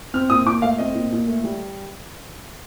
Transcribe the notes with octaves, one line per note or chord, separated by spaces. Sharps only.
C4 F6
A#2 D#6
A#2 D6
A3 F5
C4 D#5
A#2
A#2
A3
G3